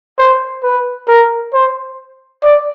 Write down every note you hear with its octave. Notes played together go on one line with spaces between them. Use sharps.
C5
B4
A#4
C5
D5